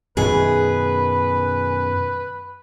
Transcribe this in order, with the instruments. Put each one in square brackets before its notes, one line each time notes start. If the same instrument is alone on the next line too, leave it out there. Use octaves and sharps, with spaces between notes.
[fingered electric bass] F#2 B2 D#3 [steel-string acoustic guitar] G#4 [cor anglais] B4